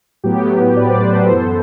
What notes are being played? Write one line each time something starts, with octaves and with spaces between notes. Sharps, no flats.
A2 F#3 B3 G4
G4 B4
D5
C5
B4
A4 C5
F#2 E3 B3